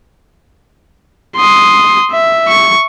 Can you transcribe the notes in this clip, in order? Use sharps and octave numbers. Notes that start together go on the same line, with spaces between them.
C6 D#6
E5
C#6